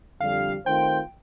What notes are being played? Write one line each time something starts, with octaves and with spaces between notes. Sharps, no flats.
F2 D3 G3 D4 F5
D#3 A3 C4 F4 C5 G5